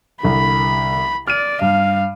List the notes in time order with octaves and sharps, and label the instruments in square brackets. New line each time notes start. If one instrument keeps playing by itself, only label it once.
[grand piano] C2 D3 [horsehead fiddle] B5
[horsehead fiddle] D5 [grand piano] F6 D7 D#7
[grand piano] G2 [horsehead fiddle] F5